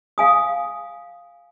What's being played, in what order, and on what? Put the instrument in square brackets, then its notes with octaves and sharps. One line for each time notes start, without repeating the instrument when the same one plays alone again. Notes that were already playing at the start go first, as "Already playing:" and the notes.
[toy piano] F5 G#5 D#6